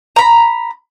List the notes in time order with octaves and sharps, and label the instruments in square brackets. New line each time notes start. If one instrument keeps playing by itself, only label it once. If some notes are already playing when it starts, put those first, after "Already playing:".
[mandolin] A#5 B5